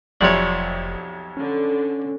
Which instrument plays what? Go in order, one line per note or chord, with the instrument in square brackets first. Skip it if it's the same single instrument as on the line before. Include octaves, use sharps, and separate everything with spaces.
[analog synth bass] F1 [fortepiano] B1 F2 C3 [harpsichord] C#5 D5
[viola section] D3 [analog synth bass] C#4